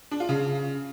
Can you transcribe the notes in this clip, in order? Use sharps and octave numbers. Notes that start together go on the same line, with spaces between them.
D4
F4
C#3